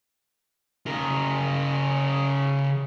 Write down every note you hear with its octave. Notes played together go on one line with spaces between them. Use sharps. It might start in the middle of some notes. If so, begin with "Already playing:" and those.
C#3 A#4